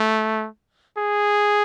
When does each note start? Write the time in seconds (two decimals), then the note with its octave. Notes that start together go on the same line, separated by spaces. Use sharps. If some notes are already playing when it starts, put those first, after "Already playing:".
Already playing: A3
0.98 G#4